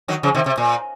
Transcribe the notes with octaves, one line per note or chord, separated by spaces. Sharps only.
D#3 F#3
C#3 F3
C3 D#3
C3
A#2